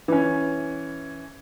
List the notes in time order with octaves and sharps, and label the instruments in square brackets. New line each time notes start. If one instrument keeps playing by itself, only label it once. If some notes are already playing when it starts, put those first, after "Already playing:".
[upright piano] E3 C#4